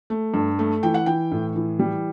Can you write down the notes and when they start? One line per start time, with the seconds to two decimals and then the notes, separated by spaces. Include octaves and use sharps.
0.10 A3
0.34 G2
0.59 A3
0.83 E3 G5
0.94 F#5
1.06 E3 G5
1.32 A2
1.56 E3
1.79 G3